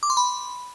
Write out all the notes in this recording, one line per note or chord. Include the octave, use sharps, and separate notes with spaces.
D6
C6
B5